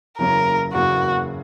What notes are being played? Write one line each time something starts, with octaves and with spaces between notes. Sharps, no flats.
F#1 E2 C#3 F#3 A#3 A#4
F#1 E2 C#3 F#3 A#3 F#4